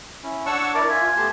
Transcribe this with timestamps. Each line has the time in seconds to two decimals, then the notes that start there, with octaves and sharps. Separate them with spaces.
0.23 C#4 E4
0.46 D4 C#5 F#5 A5 C#6 E6
0.75 E4 A#4 D5
0.90 F4 E5 G#5
1.17 A3 B3 G4 A5 C6